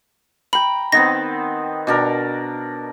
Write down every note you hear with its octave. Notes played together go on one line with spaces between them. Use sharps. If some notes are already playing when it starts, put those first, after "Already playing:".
G5 A#5 B5
D#3 B3 C4 A#6
B2 D4 A#4